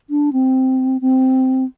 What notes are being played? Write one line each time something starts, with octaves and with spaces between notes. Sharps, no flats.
D4
C4
C4